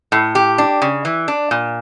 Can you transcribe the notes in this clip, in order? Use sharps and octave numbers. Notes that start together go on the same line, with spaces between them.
A2
G4
D4
C#3
E3
D4
A#2